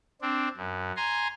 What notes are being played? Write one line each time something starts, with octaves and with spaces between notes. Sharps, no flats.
C4 D4
F#2
G#5 A#5 C6